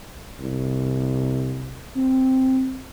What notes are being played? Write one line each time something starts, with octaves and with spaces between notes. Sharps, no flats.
C2
C4